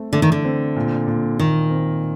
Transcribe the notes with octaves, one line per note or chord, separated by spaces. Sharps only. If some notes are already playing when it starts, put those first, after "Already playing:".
Already playing: A3 C4
D3 A3
D#3
D3
C4
A#2
A#2
A#2 D#3
C4